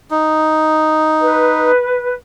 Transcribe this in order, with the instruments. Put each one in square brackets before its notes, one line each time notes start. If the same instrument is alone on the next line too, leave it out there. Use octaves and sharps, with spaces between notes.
[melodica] D#4
[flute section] B4